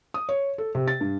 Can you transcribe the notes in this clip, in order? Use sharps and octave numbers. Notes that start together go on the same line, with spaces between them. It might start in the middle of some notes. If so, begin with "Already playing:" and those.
D#6
C#5
A4
C3
A6
G2